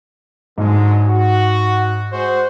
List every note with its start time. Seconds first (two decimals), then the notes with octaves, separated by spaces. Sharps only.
0.58 G#2 D3 F#3 G#3
1.08 F#4
2.11 G#3 F#4 C5